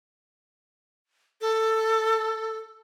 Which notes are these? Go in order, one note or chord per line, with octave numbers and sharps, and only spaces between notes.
A4